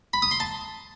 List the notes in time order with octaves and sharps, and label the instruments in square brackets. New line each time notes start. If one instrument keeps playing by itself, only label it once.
[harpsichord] B5
D#6
C6
A5